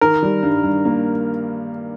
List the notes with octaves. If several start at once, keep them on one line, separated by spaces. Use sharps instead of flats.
D#3 A#4
G3
G2
G2
A#3